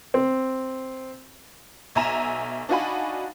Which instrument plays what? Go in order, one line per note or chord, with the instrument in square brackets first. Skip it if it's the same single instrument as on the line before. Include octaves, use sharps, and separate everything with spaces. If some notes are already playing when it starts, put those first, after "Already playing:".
[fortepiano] C4
[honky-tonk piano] B1 E5 G#5 A#5 E7
D4 D#4 F#4 F5 G#5 B5